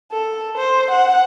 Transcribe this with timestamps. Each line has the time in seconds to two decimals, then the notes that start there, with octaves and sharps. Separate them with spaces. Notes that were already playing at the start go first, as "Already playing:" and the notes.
0.12 A4
0.58 C5
0.91 F#5